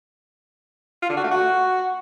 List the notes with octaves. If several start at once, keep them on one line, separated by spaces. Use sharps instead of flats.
F4
D3
F#4
A3
F#4